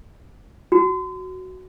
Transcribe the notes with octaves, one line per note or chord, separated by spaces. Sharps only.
F#4